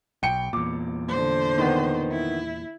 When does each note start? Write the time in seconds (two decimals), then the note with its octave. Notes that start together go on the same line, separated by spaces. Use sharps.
0.23 B1 G5 C#7
0.53 E2 A#2 D6
1.08 D3 C5
1.58 D#3 B3
2.11 E4